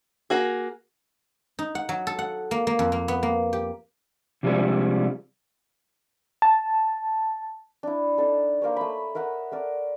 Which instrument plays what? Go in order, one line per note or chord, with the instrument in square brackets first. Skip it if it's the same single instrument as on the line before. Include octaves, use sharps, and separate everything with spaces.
[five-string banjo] A#3 F#4 G#4
[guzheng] D#4
F#5
F#3
A4
F#5
A#3
A#3
F2
A#3
B3
A#3
G4
[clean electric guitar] C3 F3 G3 G#3 D4 G#4
[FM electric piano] A5
[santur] D4 E4
D4 D#4 A4 A5
A#3 A#4 C5 C#5
A3 B5
A#4 E5 F#5 D#6
A3 A#4 D5